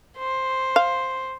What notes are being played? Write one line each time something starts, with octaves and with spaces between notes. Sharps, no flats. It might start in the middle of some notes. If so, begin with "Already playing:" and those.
C5
F5